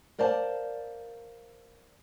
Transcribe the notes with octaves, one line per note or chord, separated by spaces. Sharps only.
A#4 C5 D5 F5 A5